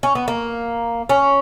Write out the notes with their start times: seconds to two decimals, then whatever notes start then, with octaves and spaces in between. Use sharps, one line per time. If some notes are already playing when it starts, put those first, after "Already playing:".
0.03 C#4
0.15 B3
0.28 A#3
1.09 C#4